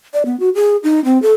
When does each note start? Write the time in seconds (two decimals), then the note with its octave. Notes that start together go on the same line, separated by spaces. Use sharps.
0.14 D5
0.25 B3
0.40 F#4
0.55 G#4
0.83 D#4
1.05 C4
1.22 A4